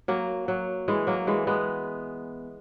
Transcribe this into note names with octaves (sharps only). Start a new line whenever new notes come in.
F#3 A#3
F#3
E3 G#3
F#3 A#3
E3 G#3
G#3 B3